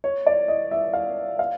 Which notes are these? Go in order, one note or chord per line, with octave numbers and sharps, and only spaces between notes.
C#5
D5
D#5
E5
F5
F5